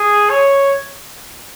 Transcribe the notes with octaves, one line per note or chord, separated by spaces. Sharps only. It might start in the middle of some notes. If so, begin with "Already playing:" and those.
Already playing: G#4
C#5